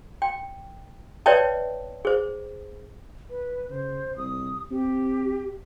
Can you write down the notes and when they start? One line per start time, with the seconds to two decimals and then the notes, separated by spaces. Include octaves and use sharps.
0.22 G5
1.26 B4 C#5 D5 E5 G5 A5
2.05 G#4 C5
3.30 B4
3.70 C#3 C5
4.17 C2 D#6
4.71 C4 G4